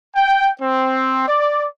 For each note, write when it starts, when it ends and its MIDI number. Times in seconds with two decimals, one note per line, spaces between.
0.14 0.52 79
0.59 1.22 60
1.27 1.65 74